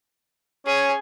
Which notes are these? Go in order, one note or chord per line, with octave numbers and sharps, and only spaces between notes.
C#4 G#4